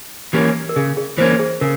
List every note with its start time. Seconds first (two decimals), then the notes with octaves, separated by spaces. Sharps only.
0.33 E3 A#3 C#4 G4
0.69 A#4
0.76 C#3 G#4
0.97 G#4
1.18 E3 A#3 C#4 C5
1.39 G#4
1.61 C#3 A#4